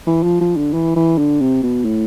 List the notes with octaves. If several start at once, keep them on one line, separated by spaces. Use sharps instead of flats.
E3
F3
F3
D3
E3
E3
D3
C3
B2
A2